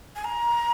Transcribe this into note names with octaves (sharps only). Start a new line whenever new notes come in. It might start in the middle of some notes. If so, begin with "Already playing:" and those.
G#5
A#5